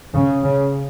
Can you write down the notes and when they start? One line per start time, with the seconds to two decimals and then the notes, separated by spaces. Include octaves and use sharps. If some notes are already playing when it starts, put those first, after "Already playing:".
0.14 C#3
0.43 C#3